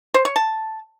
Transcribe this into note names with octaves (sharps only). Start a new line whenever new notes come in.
C5
C#5
A5